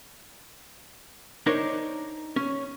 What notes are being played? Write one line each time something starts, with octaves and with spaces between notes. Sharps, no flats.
D4 D#4 A#4 C5 C#5
C#4